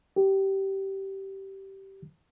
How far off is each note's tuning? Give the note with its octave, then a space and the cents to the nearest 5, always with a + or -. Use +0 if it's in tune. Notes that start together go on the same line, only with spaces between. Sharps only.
G4 -15